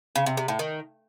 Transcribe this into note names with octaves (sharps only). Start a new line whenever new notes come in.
C#3
C3
C3
A2
D#3